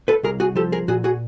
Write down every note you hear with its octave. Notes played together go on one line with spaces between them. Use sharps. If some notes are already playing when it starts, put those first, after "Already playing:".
A4 B4
C2 G#4 A#4
F#4 G#4
F3 G4 A4
G#4 A#4
A#2 F#4 G#4
F#4 G#4